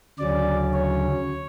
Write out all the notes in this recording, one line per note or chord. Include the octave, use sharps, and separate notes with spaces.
D2 C#3 F#3 C#4 D5
C#5